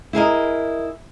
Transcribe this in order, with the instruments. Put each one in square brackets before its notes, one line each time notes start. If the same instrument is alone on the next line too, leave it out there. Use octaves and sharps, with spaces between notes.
[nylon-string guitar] E4 G#4 A#4 D#5